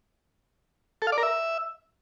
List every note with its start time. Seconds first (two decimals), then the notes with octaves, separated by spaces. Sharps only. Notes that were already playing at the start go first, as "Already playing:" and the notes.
1.02 A4
1.07 F5
1.12 D5
1.18 A#4
1.23 E5